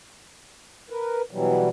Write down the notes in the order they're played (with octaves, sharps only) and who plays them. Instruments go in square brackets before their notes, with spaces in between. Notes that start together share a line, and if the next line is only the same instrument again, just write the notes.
[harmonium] A#4 B4
B2 E3 F#3 G3